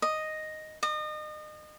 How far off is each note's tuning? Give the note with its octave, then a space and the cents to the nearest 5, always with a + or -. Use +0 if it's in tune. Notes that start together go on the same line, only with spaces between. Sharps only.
D#5 +0
D#5 -35